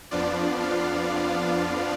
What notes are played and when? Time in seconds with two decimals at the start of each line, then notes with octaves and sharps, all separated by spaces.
0.11 F2 F3 B3 D4 F4 D5
0.62 F5